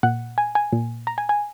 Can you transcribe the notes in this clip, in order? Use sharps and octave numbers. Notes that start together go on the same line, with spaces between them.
A#2 F#5
G#5
G#5
A#2
A#5
G#5
G#5